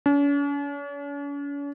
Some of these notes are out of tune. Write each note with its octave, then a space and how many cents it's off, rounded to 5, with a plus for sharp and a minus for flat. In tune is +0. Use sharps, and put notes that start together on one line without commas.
C#4 +45